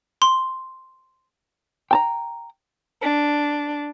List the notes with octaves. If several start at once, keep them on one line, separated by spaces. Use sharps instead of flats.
C6
G5 A5 A#5
D4